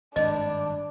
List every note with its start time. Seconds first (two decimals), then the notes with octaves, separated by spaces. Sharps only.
0.16 G#1 G2 D4 D#5